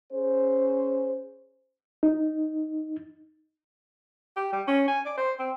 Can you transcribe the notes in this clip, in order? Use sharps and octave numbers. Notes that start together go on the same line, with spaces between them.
C#4 G#4 C5
D#4
G4
G3
C#4
G#5
D5
C5
C4